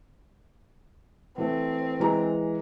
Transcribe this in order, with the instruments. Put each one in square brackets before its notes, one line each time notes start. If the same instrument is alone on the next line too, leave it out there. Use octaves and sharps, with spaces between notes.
[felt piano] E3 A3 [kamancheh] C4
[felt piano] E3 G#3 A#5